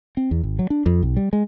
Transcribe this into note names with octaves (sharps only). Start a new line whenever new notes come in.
C4
E2
G#1
F#3
D4
F2
B1
G3
G#3